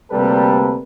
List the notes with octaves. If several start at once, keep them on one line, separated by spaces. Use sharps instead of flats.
D2 C3 G3 A#3 A4 B4